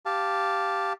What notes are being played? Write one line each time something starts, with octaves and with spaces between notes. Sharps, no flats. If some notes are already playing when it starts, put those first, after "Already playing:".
G4 F5 A5